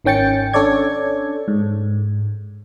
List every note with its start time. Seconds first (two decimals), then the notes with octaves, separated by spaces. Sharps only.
0.04 G#1 D#3 C#4 G5 A6 C#7
0.53 C#4 D4 A4 C#5 D5 G#6
1.48 G#2